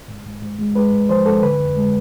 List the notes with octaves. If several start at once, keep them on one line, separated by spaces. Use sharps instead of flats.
G#2
G#2
G#2
G#3
G#3 B4
G#2
F3 C5
G#2 A4
D3 B4
F2
G#3